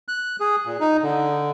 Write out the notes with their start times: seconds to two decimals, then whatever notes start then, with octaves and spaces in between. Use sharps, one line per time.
0.08 F#6
0.40 G#4
0.66 A#2
0.81 D#4
1.03 D3